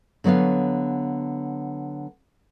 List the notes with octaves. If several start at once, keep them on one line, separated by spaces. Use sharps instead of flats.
D3 F#3 B3 C#5 F5